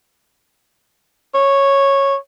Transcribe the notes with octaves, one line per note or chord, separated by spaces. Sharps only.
C#5